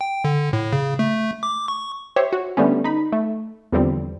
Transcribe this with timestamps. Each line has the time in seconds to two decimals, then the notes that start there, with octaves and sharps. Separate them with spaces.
0.01 G5
0.24 D3
0.53 A2
0.73 C#3
0.99 A3
1.43 D6
1.68 C#6
2.16 G4 C5 C#5 E5
2.33 F#4
2.57 D3 G3 A3 B3 C#4
2.84 D#4 B5
3.12 A3
3.72 E2 D3 F3 G3 C4